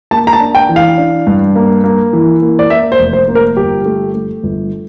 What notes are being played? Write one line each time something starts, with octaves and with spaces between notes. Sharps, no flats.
A#3 A5
A#5
A5
D4
G5
E3
F5
D4
G2
A#3
A#3
E3
A#3
D5
A#3 E5
C5
F1
C5
A#3
A#4
G1 G4
A3
A3
G1